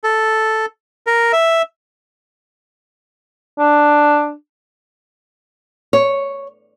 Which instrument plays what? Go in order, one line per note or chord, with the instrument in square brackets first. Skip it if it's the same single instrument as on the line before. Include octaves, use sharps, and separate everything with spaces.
[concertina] A4
A#4
E5
[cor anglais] D4
[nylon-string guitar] C#5